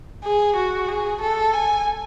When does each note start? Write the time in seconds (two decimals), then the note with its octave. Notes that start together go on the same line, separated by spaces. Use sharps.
0.24 G#4
0.56 F#4
0.88 G#4
1.21 A4
1.54 G#5